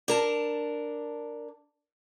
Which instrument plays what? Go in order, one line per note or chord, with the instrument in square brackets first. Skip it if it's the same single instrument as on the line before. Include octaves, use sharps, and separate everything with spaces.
[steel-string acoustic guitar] D4 A#4 A5